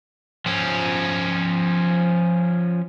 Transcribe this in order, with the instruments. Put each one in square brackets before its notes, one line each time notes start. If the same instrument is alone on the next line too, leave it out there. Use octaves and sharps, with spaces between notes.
[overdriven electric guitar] F3 C#4